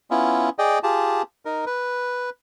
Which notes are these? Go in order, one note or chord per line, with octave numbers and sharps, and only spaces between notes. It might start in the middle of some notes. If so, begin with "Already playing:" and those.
B3 C#4 E4 F4
G#4 D5 D#5 G5
F4 G4 G#4 A5
D#4 A#4
B4